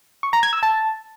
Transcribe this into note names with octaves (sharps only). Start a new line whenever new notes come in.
C#6
A#5
G#6
E6
A5